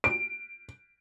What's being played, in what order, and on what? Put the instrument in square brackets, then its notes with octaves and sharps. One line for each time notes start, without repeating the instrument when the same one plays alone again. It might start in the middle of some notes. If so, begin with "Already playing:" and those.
[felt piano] D7